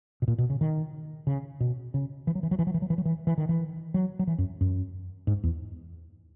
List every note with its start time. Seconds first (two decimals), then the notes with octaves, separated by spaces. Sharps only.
0.22 B2
0.28 A#2
0.38 B2
0.50 C#3
0.61 D#3
1.27 C#3
1.60 B2
1.94 C#3
2.27 E3
2.35 F#3
2.43 E3
2.51 F#3
2.59 E3
2.67 F#3
2.74 E3
2.82 F#3
2.90 E3
2.98 F#3
3.05 E3
3.27 E3
3.38 D#3
3.49 E3
3.94 F#3
4.19 F#3
4.27 E3
4.38 F#2
4.61 F#2
5.27 G#2
5.44 E2